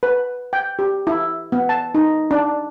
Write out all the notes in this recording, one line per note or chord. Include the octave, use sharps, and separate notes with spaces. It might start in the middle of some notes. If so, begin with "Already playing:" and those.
B4
G5
G4
E4
B3
A5
D#4
D4